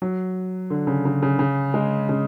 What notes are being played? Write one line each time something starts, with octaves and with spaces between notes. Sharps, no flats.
F#3
D3
C#3
C#3
C#3
C#3
G#3
C#3